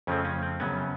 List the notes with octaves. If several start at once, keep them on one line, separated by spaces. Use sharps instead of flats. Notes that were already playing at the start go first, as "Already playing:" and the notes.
F2 C#3 F3 A3 C4 C#4
C#4
C4
F#2 C#3 F#3 B3 C#4